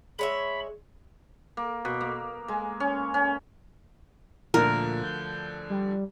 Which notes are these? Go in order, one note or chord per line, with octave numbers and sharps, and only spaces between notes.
G#3 C#5 E5 B5
A#3
B2
A#3
G#3
C#4
C#4
D2 A#2 D3 F3 A#4
G6
G3